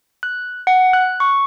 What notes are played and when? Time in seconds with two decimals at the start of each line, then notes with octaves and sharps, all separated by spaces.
0.23 F#6
0.67 F#5
0.93 F#6
1.20 C#6